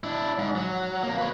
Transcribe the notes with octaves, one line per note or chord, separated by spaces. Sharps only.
D4 E4
G#2
F#3
F2 A#3
B4 C#5